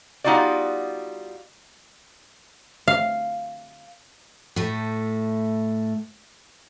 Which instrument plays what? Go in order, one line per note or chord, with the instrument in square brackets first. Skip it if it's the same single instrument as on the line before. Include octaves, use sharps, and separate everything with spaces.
[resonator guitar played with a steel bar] G3 B3 D#4 F4 F#4 D5
[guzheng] F5
[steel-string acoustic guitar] A2 A3